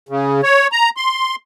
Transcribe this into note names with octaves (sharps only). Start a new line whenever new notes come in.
C#3
C#5
A#5
C6